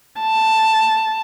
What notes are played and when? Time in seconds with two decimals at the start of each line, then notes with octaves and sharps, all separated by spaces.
0.20 A5